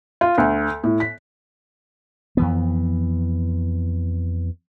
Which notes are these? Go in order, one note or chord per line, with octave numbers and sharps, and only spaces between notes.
F4
D2
A2
B6
F2 E3 B3